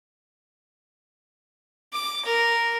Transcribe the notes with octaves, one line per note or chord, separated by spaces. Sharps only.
D6
A#4